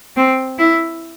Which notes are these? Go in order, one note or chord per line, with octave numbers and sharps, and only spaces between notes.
C4
E4